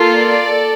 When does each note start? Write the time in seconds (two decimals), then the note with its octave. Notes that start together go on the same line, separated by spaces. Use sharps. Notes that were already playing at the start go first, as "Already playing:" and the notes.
Already playing: A#3 F4 A4
0.15 D5
0.45 A4